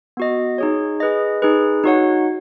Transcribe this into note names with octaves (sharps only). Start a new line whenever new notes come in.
B3 F#4 D#5
D#4 G#4 C#5
G#4 B4 D#5
D#4 G#4 B4
D#4 F#4 C#5 F#5